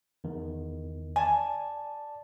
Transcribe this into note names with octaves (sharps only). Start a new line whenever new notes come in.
E2 D#3
D5 G#5 A5